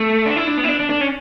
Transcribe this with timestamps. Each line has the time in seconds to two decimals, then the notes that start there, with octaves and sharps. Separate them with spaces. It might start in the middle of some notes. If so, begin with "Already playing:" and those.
Already playing: A3
0.26 D4
0.36 E4
0.47 D4
0.57 B3
0.64 E4
0.69 D4
0.80 D4
0.90 D4
1.01 C#4